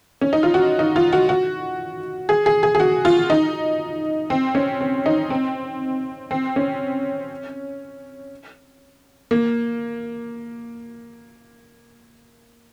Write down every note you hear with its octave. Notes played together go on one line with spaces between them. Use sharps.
C#4
D#4
F4
F#4
D#4
F4
F#4
F#4
G#4
G#4
G#4
G#4
F#4
F4
D#4
C4
C#4
C4
D#4
C4
C4
C#4
A#3